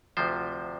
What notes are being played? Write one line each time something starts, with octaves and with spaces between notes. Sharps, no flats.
D2 C3 F3 C5